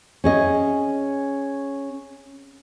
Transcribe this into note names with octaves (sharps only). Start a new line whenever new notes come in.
C#4 G#4 D#5